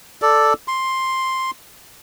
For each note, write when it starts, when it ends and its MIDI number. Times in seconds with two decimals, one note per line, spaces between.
0.22 0.53 69
0.22 0.53 74
0.68 1.51 84